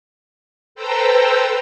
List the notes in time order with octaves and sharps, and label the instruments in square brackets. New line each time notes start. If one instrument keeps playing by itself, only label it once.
[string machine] A4 B4 C5 G5 A#5 E6